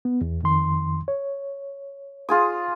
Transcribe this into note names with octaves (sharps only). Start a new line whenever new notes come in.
B3
E2
F2 D#3 C6
C#5
F4 G#4 D#6